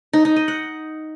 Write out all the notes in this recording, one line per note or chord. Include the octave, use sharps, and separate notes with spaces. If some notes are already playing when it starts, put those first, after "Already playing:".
D#4
D#4
D#5
F#5